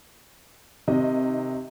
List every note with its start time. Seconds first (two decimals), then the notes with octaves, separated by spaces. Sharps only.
0.88 C3 D#3 D#5